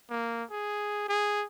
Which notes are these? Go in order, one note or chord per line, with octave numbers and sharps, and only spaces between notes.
A#3
G#4
G#4